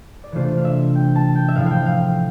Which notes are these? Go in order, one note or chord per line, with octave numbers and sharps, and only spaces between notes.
D5
C3 E3 A3 D4 F4 C5
F5
E5
G5
A5
G5
E5
A2 F3 A3 E4 F5
F5 G5
F5